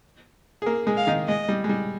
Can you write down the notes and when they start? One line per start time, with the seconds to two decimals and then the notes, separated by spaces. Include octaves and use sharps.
0.62 G#4
0.66 A#3 A#4
0.87 G#3 G#4
0.97 F5
1.07 D#3 D#4
1.28 G#3 D#5
1.48 G3
1.64 G#3
1.69 G3